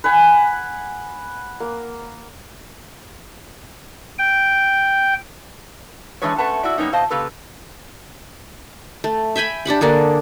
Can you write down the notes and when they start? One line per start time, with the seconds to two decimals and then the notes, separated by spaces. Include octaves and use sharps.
0.04 B4 F#5 G#5
1.60 A#3
4.19 G5
6.22 E3 G#3 D4 G#4 B4 C#5
6.38 A3 C#4 B4 F#5 A5
6.63 E4 F#4 D5
6.78 G3 A#3 B3 C#4 D#4
6.93 B2 C5 D#5 F5 A5
7.10 C#3 A#3 G4 A4 B4
9.04 A3
9.36 E5 G5 G#5 B5
9.65 D4 G4 F#5 B5
9.81 D3 A#3 D4 G#4